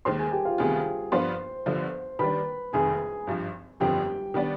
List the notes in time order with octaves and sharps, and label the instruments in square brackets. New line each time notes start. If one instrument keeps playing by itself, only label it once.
[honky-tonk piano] D#2 D#3 G#3 [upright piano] C5 C6
[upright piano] G#4 G#5
G4 G5
F4 F5
[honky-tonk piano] D2 C3 D#3 B3 F4 [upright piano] G#4 G#5
[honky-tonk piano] G2 F3 B3 D4 F4 [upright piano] C5 C6
[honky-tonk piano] G1 G2 D3 F3
[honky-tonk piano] D#3 G3 D4 [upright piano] B4 B5
[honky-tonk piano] F1 F2 D#3 [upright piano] G#4 G#5
[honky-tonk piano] G#1 G2 F3
[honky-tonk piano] G1 F2 D3 F3 [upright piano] G4 G5
[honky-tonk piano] D#3 G3 B3 D4